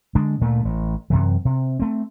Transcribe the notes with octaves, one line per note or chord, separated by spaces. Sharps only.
D3 G#3 D4
D2 A#2 A3
A1
F#2 C3 E3
C3
A3 C4